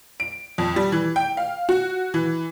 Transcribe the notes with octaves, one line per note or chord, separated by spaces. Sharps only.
D7
F2
G3
E3
G5
F5
F#4
E3